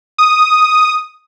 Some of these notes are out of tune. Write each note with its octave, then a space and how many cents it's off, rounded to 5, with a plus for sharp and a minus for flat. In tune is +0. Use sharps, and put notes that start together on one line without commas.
D#6 +0